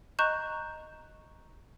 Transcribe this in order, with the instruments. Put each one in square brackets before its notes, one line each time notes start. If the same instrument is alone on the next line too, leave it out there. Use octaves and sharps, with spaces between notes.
[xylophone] D#5 A#5 C#6 F#6 G6 E7